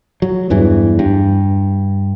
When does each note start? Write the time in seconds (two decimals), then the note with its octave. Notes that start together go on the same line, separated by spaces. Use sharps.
0.22 F#3
0.50 E2 G2 E3
0.99 G2